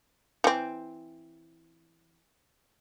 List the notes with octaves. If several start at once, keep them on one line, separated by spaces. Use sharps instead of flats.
E3 C4